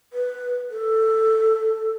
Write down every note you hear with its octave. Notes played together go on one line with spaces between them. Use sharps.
B4
A4